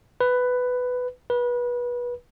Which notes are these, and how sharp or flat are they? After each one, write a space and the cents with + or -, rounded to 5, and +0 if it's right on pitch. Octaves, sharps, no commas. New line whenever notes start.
B4 +10
B4 -25